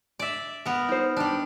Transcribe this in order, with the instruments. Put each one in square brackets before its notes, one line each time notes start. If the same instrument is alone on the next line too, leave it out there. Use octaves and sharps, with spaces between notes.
[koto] D5 E5
B3 A#4
[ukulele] D#4 C5
[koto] G3 D4